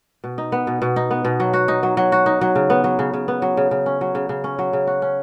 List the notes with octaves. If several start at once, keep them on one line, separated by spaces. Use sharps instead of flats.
B2
D#4
B3
B2
B2
D#4
B3
B2
F#3
F#4
D#4
F#3
F#3
F#4
D#4
F#3
C#3
B3
F#3
C#3
C#3
B3
F#3
C#3
C#3
C#4
F#3
C#3
C#3
C#4
F#3
C#3
F#4
C#4